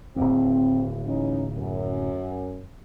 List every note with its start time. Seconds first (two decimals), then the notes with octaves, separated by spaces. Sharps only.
0.16 D1 D#2 C4
1.05 E3 C#4 D#4
1.56 F#2